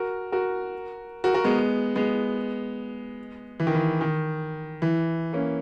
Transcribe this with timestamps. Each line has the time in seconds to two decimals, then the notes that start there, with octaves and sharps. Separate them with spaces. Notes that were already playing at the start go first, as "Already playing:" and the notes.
Already playing: F#4 A#4
0.32 F#4 A#4
1.24 F#4 A#4
1.34 F#4 A#4
1.44 G#3 B3
1.96 G#3 B3
3.60 E3
3.67 D#3
3.75 E3
4.01 D#3
4.82 E3
5.33 A#3 C#4